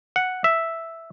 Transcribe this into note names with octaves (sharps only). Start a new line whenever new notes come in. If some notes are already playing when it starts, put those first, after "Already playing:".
F#5
E5